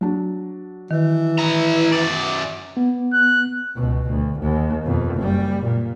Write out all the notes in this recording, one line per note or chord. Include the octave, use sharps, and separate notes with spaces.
F#3 D4
D#3 E3
E4 A#5
F#2 D5
B3
F#6
C#2 B2
D2
D#2
F2 B2
F#1 G3
A#2